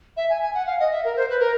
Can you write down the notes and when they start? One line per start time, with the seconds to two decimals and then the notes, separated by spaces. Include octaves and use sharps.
0.17 E5
0.30 G#5
0.42 G#5
0.54 F#5
0.66 F5
0.79 D#5
0.92 E5
1.04 A#4
1.17 C5
1.30 B4
1.40 A#4